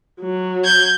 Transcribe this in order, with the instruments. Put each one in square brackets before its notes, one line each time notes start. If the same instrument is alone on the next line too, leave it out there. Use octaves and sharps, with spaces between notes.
[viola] F#3
[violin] G6 G#6